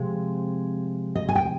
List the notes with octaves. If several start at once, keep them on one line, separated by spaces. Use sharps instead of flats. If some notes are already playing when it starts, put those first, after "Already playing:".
Already playing: C3 F3 G#3 C4
D#5
G#5
G5